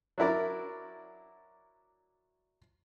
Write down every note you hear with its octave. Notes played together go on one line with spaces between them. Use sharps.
F#3 D4 E4 A#4 D5